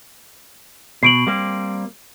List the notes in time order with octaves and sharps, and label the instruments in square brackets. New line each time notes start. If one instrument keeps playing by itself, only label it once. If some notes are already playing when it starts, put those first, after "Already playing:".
[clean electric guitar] B2 [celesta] C7 D7 F#7
[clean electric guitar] G3 A#3 C4